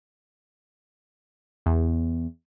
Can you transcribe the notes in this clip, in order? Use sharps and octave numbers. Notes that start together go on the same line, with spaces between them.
E2